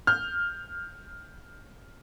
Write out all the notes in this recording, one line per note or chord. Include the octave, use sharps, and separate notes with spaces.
F6 G6